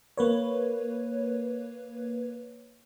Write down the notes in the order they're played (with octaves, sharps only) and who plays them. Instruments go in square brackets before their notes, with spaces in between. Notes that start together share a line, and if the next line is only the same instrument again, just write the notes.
[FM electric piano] A#3 B4 C#5